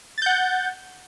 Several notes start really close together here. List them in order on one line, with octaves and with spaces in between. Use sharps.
A6 G6 F#5